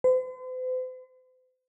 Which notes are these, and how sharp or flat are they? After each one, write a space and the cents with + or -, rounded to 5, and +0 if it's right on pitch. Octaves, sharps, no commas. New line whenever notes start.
C5 -45